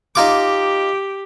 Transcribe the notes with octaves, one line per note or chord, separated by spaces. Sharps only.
D#4 F4 G4 D6